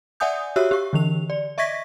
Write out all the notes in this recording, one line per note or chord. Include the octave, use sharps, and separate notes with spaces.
D5 E5 F#5 G#5 D#6 G6
F#4 G4 C#5 E5 E6 F#6
G4 C#6
D3 E3 F7
D5
D#5 E5 C#6 G#6 A#6 B6